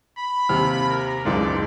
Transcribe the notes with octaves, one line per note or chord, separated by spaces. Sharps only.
B5
D#2 C3 F6
A#4
F#1 C#2 G#2 D5